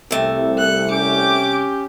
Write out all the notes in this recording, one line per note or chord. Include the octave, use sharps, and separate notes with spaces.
C2 C3 A3
F#6 C#7
C#4 G4 D6